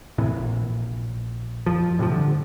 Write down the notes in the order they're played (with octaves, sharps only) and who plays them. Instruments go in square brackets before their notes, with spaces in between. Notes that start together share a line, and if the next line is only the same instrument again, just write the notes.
[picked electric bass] D#2 A2 C3 E3
A#1
F2 F3
A2 C3 E3 F3
G2 D3